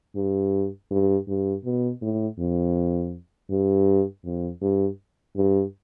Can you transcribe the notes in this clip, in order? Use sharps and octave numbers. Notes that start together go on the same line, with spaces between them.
G2
G2
G2
B2
A2
F2
G2
F2
G2
G2